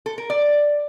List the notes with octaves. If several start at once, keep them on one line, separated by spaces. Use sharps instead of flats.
A4
A#4
D5